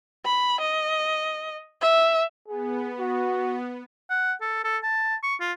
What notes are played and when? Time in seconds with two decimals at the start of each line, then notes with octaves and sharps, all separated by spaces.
0.25 B5
0.60 D#5
1.81 E5
2.48 B3 G#4
2.99 F#4
4.10 F#5
4.41 A4
4.64 A4
4.83 A5
5.23 C#6
5.40 F4